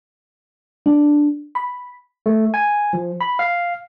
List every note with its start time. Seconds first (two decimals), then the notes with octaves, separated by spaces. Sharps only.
0.86 D4
1.55 B5
2.26 A3
2.54 G#5
2.93 F3
3.21 B5
3.39 F5